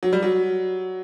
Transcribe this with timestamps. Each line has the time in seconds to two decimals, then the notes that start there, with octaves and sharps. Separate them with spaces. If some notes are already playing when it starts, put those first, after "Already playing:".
0.03 F#3
0.13 G3
0.23 F#3